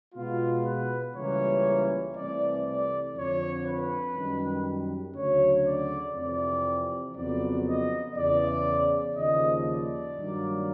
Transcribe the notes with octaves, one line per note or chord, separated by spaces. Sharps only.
B2 G#3 B3 F4
B4
C#2 C#3 E3 G3 A#3 C#5
C2 C3 E3 A3 D5
D5
F2 D3 F3 C#5
B4
F#2 D#3 G3
D2 C#3 F#3 C#5
D5
F2 C3 E3 D5
F2 C#3 F#3 B3 D5
D#5
E2 C#3 E3 D5
D#2 C#3 F3 D#5
D5
G2 D#3 F#3 A#3